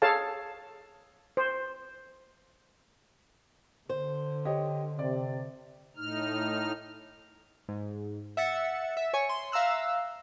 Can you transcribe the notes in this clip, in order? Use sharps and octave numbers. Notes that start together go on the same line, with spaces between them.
G#4 A4 C#5 F5 A5
C5
D3 C5
G4 C#5 D#5
C3 D5
A2 D#4 F6
G#2
E5 F#5 A6 C#7
E5
C#5 G#5 C#6
C6
E5 F5 A#5 E6 F#6